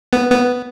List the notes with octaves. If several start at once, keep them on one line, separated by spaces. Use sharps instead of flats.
B3
B3